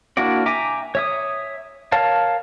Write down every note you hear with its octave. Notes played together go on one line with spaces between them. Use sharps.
A#3 D4 E4 F#4 D5
E5 G5 G#5 A#5 D6
C#5 E5 D#6
A#4 C#5 F5 A5